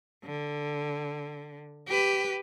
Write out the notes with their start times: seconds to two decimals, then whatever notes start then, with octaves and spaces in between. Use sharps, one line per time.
0.24 D3
1.87 G4 B4